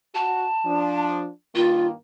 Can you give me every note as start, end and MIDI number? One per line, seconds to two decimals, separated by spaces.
0.15 0.46 66
0.15 1.05 81
0.65 1.29 53
0.65 1.29 62
1.55 1.92 43
1.55 1.92 51
1.55 1.92 58
1.55 1.87 65